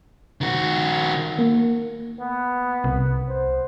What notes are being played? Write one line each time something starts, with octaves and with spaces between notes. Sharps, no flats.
D#3 F#4
A#3
B3
C2
C5